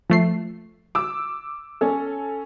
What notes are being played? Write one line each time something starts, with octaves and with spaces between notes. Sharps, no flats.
F3 A3 C7
D6 E6
C#4 A4